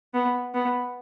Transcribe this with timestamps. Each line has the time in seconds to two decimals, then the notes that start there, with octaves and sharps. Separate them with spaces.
0.14 B3
0.54 B3